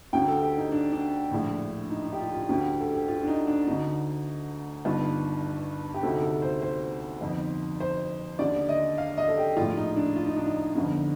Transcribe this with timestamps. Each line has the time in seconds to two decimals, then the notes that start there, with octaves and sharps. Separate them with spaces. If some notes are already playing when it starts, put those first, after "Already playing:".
0.13 D2 D3 G5
0.28 A4
0.42 G4
0.57 D#4
0.72 D4
0.93 D4
1.31 A#1 A2
1.90 D#4
2.05 D#4
2.13 G4
2.20 F4
2.34 F4
2.49 D2 D3 G4
2.80 A4
2.94 G4
3.08 F4
3.23 D4
3.27 D#4
3.47 D4
3.67 D2 D3 D#4
4.85 G1 G2 D#3 F4
5.94 G4
6.03 D2 C3 D#3 A4
6.23 A4
6.42 C5
6.62 C5
7.21 G1 F2 D#3
7.80 C5
8.39 D#2 D3 D5
8.69 D#5
8.98 F5
9.17 D#5
9.28 A4
9.37 G4
9.57 A#1 A2 F4
9.77 D#4
9.96 D4
10.16 F4
10.27 D#4
10.37 D4
10.46 D#4
10.75 G1 F2 D3